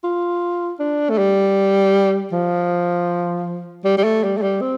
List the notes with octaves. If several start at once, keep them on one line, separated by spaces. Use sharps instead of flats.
F4
D4
A3
G3
F3
G3
G3
A3
G3
A3
G3
C4